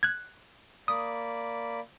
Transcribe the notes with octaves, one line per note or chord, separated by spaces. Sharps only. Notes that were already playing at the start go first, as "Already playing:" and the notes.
F#6 G#6
A#3 D5 B5 D#6